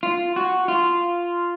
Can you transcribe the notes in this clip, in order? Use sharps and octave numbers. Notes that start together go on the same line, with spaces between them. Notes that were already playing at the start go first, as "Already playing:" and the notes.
F4
F#4
F4